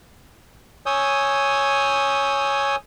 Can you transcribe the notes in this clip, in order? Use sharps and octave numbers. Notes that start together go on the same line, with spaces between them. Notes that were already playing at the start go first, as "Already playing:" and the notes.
C#5 G#5 D#6 E6 G6